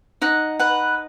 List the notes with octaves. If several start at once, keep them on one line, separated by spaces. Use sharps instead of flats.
D#4 F#5
B4 F#5